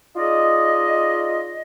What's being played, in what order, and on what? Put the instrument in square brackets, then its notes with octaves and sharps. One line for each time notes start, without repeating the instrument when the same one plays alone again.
[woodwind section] D#4 F4 G#4 D5 D#5